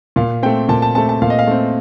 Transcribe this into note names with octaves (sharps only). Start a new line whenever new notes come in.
A#2 F5
A3 C4 G5
A#2 A5
A5
A3 C4 A5
A5
A#2 F5
D#5
F5
A3 C4